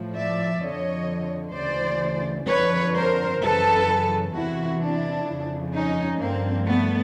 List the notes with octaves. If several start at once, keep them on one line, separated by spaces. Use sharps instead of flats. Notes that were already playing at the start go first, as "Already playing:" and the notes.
Already playing: A2 F3
D5 E5
F2 D3 F3 C#5 D#5
D2 C#3 E3 C5 D5
F2 D3 F3 B4 C#5
A#4 C5
F#2 C#3 E3 A4 B4
E2 C3 E3 E4 F#4
D4 E4
F2 C#3 F3
C#4 D#4
G2 D3 F3 A#3 C4
A3 B3